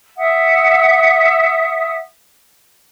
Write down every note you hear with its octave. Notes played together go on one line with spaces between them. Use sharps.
E5 F#5 D#6